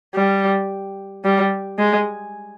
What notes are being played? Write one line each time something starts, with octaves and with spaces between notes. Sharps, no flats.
G3
G3
G#3